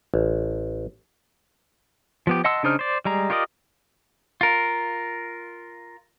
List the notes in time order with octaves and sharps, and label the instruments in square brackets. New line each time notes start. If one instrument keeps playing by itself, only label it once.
[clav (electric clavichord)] A1
[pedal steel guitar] F3 B3 G4
D#5 F#5 A5 C6 E6
C#3 D4 D#4 C5 F6
C5 D5
G3 G#3 A#5
F4 G4 A#4 D5 D#5
F4 A#4